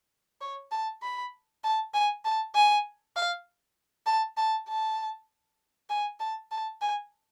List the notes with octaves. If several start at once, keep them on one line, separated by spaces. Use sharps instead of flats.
C#5
A5
B5
A5
G#5
A5
G#5
F5
A5
A5
A5
G#5
A5
A5
G#5